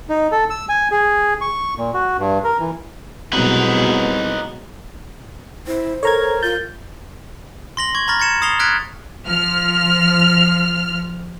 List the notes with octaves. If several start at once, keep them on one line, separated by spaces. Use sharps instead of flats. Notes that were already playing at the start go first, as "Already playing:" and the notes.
D#4
A4
E6
G#5
G#4
C#6
A#2
F#4
G2
A#4
E3
C2 B2 F#3 G#3 D#4 B4
E4 C5
A4 A#4 C#5 A#5 G#6
F4 G6 A6
C6 A#6 F#7
C#6 G#6
A#5 B5 C#6 F6 A6 A#6
G#6 A6 C#7 E7
D#6 A6 C7 F7 G7
F6 F#6 G#6 A6 B6 D7
F3 F6